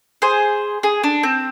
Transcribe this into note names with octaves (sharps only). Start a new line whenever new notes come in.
G#4 C5
G#4
D4
C4